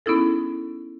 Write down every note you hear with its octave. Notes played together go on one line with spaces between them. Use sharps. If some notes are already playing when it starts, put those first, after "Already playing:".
B3 C#4 D#4 E4 G#4 A4